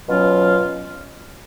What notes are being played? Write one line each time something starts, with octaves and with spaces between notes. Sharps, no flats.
B2 F#3 C#4 F4